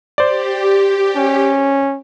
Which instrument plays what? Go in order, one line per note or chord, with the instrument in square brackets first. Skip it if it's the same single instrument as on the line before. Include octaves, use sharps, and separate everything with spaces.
[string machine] G4 [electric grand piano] C5 D5
[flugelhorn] C#4